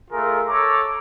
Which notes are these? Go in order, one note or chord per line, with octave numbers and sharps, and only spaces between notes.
A3 F4 G#4 A#4
A4 C#5 A#5 D6